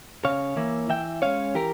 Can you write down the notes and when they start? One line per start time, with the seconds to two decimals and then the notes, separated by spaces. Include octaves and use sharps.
0.25 C#3 C#5 F5
0.57 E3 A#3 E4
0.89 E3 E5 G5
1.22 G#3 C#4 C#5 F5
1.55 E3 G4 A#4